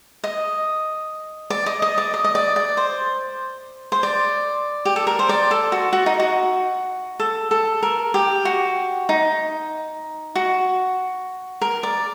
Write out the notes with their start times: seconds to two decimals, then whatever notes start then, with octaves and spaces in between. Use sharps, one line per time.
0.24 D#5
1.50 D5
1.66 D#5
1.82 D#5
1.98 D5
2.14 D#5
2.24 D#5
2.35 D5
2.56 D5
2.77 C5
3.92 C5
4.03 D5
4.85 G4
4.96 A4
5.07 A#4
5.19 C5
5.29 D5
5.51 A4
5.72 F#4
5.93 F#4
6.06 D#4
6.20 F#4
7.20 A4
7.51 A4
7.83 A#4
8.14 G4
8.45 F#4
9.09 D#4
10.35 F#4
11.61 A#4
11.83 D5